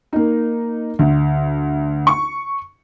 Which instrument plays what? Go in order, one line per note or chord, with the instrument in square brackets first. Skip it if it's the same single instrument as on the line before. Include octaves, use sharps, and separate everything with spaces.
[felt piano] A#3 D#4
D2
C#6